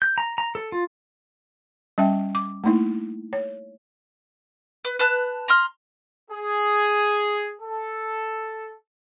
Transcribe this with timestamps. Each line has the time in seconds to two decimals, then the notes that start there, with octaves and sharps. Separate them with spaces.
0.02 G6
0.18 A#5
0.38 A#5
0.55 A4
0.72 F4
1.98 G3 C#4 E5 G5
2.35 D6
2.64 A3 A#3 D#4 E4
3.33 C#5
4.85 B4
4.99 B4 A5 F#6
5.48 A#5 C6 F6
6.31 G#4
7.62 A4